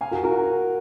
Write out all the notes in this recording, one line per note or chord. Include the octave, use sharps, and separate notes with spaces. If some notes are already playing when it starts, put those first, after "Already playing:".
F5 G#5
F#4 A#4
F#4 A#4